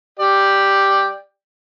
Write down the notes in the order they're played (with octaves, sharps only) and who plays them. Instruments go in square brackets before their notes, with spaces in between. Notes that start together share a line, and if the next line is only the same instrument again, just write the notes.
[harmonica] G4 D5 G5